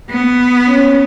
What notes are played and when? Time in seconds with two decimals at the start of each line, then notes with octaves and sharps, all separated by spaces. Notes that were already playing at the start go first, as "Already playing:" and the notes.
0.10 B3
0.68 C#4